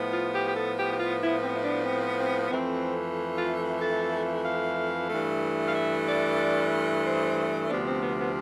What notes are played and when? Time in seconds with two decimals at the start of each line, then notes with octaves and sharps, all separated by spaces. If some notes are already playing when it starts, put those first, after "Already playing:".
Already playing: A2 F3 B3
0.13 F4
0.35 G4
0.48 G4
0.56 A4
0.78 G4
0.93 G4
1.00 F4
1.20 E4
1.43 C4
1.56 E4
1.64 D4
1.85 C4
2.18 C4
2.50 F2 E3 A3 C4
3.37 F4
3.81 A4
4.45 F5
5.10 G2 E3 A3
5.68 F5
5.75 E5
6.07 D5
7.05 C5
7.69 D2 C3 F3 B3 D4
7.86 C4
8.02 B3
8.18 B3